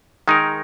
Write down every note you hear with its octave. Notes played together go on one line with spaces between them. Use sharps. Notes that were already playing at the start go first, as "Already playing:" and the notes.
D#3 G#3 D#4 A#4